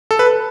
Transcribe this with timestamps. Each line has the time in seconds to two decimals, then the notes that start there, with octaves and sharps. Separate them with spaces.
0.11 A4
0.19 B4